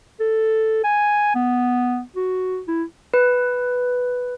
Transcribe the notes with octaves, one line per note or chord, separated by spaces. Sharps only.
A4
G#5
B3
F#4
E4
B4